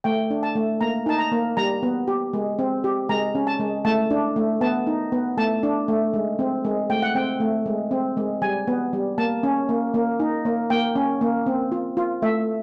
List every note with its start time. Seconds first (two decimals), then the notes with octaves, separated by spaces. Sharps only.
0.04 A3 G5
0.30 D4
0.43 A5
0.55 A3
0.81 A#3 A#5
1.06 D#4 A5
1.18 A#5
1.31 A#3
1.57 G3 A#5
1.83 B3
2.08 G4
2.34 G#3
2.59 C4
2.84 G4
3.09 G#3 A#5
3.35 C#4
3.47 A5
3.60 G#3
3.85 A3 A5
4.11 D4
4.36 A3
4.61 B3 A5
4.87 D#4
5.12 B3
5.38 A3 A5
5.63 D4
5.88 A3
6.14 G#3
6.39 C4
6.65 G#3
6.90 A3 G5
7.02 F#5
7.15 C4 G5
7.40 A3
7.66 G#3
7.91 C4
8.17 G#3
8.42 G3 G#5
8.68 B3
8.93 G3
9.18 A#3 A5
9.43 C#4
9.69 A#3
9.94 A#3
10.20 D#4
10.45 A#3
10.70 A#3 G5
10.96 C#4
11.21 A#3
11.46 C4
11.72 F4
11.97 F4
12.22 A3 E5